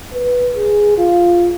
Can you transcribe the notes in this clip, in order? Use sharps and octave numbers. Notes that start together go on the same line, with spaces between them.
B4
G#4
F4